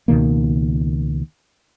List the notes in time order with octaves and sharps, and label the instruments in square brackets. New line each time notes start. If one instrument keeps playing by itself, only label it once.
[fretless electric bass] C#2 B2 D#3 A#3